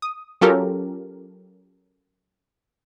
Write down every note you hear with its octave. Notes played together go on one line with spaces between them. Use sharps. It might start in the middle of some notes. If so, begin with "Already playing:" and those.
D#6
F#3 C#4 F4 G4 A4 A#4